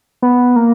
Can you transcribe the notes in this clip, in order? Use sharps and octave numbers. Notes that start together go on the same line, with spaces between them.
B3
A#3